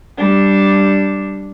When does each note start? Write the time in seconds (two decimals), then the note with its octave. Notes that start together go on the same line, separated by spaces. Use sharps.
0.18 G3 D4